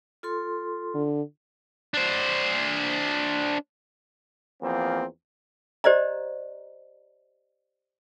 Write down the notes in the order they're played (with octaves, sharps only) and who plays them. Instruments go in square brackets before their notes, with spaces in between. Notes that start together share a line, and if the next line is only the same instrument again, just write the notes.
[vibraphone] F4 A4 C6
[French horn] D3
[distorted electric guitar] D4 C5
[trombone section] E2 F3 A#3 C4
[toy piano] G4 C5 D5 D#5 A#5